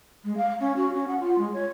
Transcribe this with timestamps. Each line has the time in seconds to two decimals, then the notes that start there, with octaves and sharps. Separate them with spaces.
0.25 G#3
0.37 F5
0.60 C#4
0.76 F#4
0.94 C#4
1.08 F#5
1.20 F4
1.38 G#3
1.53 C#5